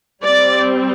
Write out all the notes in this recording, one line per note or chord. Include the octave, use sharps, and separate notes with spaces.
G3 C4 D5